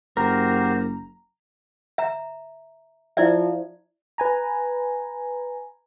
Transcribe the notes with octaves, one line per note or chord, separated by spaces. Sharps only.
F#1 F#4 G4 A#4 C5 A#5
E5 A#5
F3 E4 D5 E5
B4 G#5 A#5